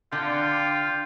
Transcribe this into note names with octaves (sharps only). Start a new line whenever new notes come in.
D3 F4 G5